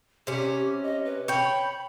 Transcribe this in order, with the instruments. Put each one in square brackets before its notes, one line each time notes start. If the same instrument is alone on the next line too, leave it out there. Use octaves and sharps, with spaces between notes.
[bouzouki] C3 C#4 [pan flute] G4
[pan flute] D#5
B4
[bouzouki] C#5 G5 [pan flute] B5